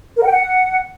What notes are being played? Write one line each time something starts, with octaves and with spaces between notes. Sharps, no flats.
A#4
F#5
G5
F#5